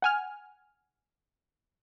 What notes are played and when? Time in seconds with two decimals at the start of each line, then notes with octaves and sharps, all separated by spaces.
0.02 F#5 G#5 F6